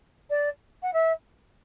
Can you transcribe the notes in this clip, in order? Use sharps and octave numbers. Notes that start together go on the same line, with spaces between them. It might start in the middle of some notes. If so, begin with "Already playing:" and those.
D5
F#5
E5